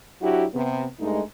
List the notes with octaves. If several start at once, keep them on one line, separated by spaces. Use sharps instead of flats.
F#3 D4 E4 F#4 G4
C3 B3
G2 G#3 A3 D#4